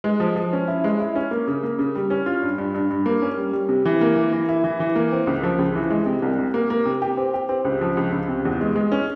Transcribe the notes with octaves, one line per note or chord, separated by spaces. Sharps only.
G#3
F3
F3
C#4
E4
G#3
E4
C#4
A#3
C#3
A#3
C#3
G3
C#4
F4
G2
G2
G2
G2
A#3
C#4
G3
G3
C3
E3
A#3
E3
E3
E4
E3
E3
A#3
C4
C#2
F3
C#2
E3
G#3
C3
C2
C3
A#3
A#3
C3
G4
C4
G4
C4
C#2
F3
C#2
C#2
C3
E2
G#3
G#3
C#4